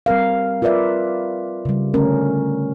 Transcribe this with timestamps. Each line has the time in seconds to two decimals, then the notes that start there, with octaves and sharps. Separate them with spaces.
0.06 G3 C4 A#4 F5
0.62 F4 A#4 B4 D5 E5
1.65 C#3 G3
1.94 D3 A3 C#4 A#4